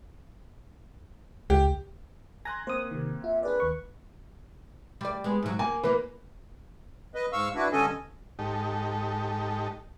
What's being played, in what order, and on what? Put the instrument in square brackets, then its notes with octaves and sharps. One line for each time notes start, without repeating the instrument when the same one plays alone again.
[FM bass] C#2 [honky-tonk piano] G4
[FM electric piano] G#5 A#5 A#6 [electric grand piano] C6 F#6 G#6
[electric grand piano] A#3 C4 [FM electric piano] C5 D#6
[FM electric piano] C3 D#3
[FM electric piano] F4 [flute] E5
[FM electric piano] D4 G#4 D5 [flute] B4
[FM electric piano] D#2 C#6
[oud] G3 D5
G#3 B3
G#2 F#3
[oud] A#3 [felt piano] G#5
[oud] E3 A#3 [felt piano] B4
[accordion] B4 D#5
G#2 F5 C#6 E6
D4 E4 F#4 B4
G2 D3 C#4 A4 D#5 G#5
[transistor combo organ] G#2 D#4 G4 A4